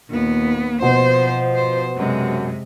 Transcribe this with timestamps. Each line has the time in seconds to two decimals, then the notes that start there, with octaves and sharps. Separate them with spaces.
0.10 D#2 A#2 B3
0.82 B2 F3 C5
1.55 C5
1.97 F#2 C3 G#3